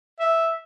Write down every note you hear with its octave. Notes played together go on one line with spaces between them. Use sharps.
E5